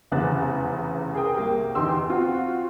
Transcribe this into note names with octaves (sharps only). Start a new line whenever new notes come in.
F1 E2 C#3 B3 F#6 A6
G#4 A#4 G5 D#6
C2 A#3 G4 G5
E2 D#4 G4 G5 C6 E6
C4 F4 F#4